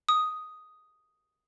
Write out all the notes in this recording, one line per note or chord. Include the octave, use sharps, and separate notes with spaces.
D#6